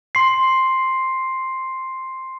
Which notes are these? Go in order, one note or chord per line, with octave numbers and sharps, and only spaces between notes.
C6 C7